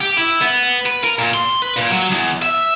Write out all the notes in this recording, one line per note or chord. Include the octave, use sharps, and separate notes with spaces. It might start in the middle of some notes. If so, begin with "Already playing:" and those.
G4
E4
B3
B4
A#4
A#2
C6
B4
A#2
F#3
E2
E5